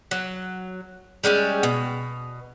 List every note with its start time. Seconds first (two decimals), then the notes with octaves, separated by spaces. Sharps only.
0.11 F#3
1.24 G3 G#3 B3 C#4
1.63 B2